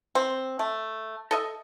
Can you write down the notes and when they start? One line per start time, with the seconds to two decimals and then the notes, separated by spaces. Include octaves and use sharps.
0.15 C4
0.59 A3
1.31 A4 D#5 E5